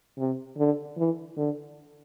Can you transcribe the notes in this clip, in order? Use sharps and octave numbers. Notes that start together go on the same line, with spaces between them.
C3
D3
E3
D3